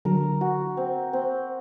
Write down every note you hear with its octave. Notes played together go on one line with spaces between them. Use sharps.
D3 F#3 A#4
F#4
C4
C4